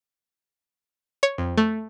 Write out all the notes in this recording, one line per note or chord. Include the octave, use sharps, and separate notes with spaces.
C#5
F2
A3